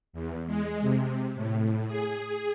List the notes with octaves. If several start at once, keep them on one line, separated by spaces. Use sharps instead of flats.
E2
G#3
C3
A2
G#4